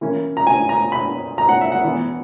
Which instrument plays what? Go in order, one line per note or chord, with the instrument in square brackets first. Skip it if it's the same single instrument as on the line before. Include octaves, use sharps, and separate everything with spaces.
[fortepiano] E3 A#3 C#4
A#5
G#5
A#5
B5
A#5
F#5
E5
F#5
E3 B3